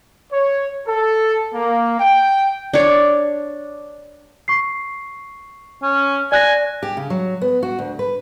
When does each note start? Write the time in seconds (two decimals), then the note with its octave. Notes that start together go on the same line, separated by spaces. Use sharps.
0.32 C#5
0.87 A4
1.54 A#3
1.98 G5
2.74 D4 C#5
4.48 C#6 C7
5.82 C#4
6.32 D5 G#5 F#6 A#6
6.83 G4
6.97 C#3
7.10 F#3
7.42 B3
7.63 F#4
7.79 D2
7.99 B4